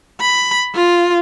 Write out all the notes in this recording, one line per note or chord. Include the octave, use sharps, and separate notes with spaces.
B5
F4